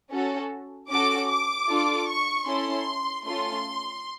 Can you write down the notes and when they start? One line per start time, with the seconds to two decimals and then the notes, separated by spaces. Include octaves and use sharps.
0.11 C#4 F#4 A4
0.90 C#4 F#4 A4 D6
1.29 D6
1.68 D4 F4 A4
2.08 C#6
2.46 C#4 E4 A4 C6
3.25 A3 C#4 F4 A4 C6